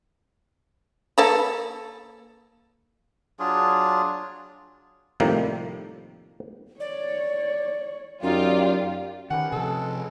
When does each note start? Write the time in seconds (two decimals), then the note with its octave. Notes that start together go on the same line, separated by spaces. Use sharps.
1.18 A#3 A4 B4
3.39 F#3 D4 F4 G#4
5.20 A2 C3 D#3 F3 G3 A#3
6.80 C#5 D5
8.23 F#2 D#4 F4 G4 D5
9.31 D#3 C#4 G4 B4 F#5
9.52 C3 F3 G#3 A4